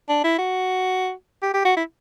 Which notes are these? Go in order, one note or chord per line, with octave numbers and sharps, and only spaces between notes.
D4
E4
F#4
G4
G4
F#4
E4